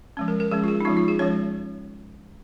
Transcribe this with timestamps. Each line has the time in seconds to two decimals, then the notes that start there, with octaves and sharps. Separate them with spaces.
0.17 F3 G#3 C#4
0.28 A#4
0.40 A#4
0.51 F3 G#3 C#4 G#4
0.64 F4
0.68 G#4
0.80 D#4
0.85 F3 G#3 C#4 F4
0.97 F4
1.08 G#4
1.19 F3 G#3 C#4 C#5